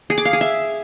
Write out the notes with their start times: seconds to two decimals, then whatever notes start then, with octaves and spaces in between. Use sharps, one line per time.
0.10 G#4
0.18 D6
0.25 F5
0.33 G#4
0.41 E5